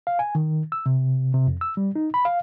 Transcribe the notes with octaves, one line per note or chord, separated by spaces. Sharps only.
F5
G#5
D#3
E6
C3
C3
F2
E6
G3
D#4
B5
F5